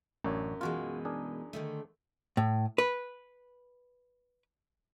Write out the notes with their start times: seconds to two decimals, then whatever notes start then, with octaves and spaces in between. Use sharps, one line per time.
0.24 A1 F#2 D4 C#5
0.61 B2 E3 G#3 F4 F#4
1.05 D4 G#4 A#4
1.53 D3 D#3 A3
2.37 A2
2.78 B4